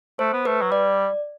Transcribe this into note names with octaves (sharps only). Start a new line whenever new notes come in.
A3 C5
B3
A3 B4
F#3
G3 D5